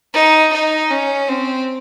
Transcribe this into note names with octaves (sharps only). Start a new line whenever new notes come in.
D#4
D#4
C#4
C4